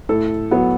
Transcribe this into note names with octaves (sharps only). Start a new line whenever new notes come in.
A2 A4
F#3 B3